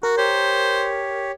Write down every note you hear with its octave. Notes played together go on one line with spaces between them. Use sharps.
F#4 A#4
G4 C5 C#5